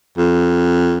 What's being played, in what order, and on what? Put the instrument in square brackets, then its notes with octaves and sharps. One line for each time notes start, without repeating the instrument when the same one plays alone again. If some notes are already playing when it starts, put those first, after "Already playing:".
[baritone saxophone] F2